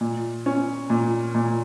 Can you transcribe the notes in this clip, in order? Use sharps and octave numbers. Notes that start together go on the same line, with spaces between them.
A#2
C#4
A#2
A#2